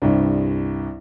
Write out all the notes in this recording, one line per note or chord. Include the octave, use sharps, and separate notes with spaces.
C2 G2